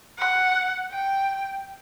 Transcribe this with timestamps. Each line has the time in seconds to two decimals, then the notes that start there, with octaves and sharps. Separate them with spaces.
0.19 F#5
0.91 G5